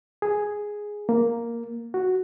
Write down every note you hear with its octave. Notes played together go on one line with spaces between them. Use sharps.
G#4
A#3
F#4